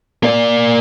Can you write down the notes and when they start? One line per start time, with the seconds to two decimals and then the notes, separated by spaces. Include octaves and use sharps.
0.23 A#3 D5